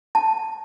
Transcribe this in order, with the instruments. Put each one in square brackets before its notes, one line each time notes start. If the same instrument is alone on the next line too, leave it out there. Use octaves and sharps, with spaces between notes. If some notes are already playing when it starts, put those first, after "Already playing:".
[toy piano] A5